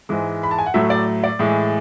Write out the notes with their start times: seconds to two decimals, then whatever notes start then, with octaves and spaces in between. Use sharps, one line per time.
0.09 G#2 E3 G#3
0.43 B5
0.51 A5
0.58 G#5
0.66 F#5
0.74 A2 F#3 A3 E5
0.90 D5
1.24 D5
1.39 A2 E3 G#3